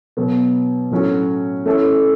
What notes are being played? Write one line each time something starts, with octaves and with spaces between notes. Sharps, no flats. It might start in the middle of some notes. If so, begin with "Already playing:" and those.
B2 F#3 B3
A2 F#3 C#4 F#4
A3 C#4 E4 A4